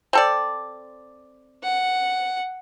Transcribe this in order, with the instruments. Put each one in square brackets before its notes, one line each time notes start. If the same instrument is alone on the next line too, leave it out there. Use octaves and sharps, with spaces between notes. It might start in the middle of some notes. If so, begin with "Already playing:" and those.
[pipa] C4 A4 D5
[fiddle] F#5